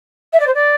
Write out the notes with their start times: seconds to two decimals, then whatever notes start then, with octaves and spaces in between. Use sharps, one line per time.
0.33 E5
0.40 D5
0.47 C5
0.54 D5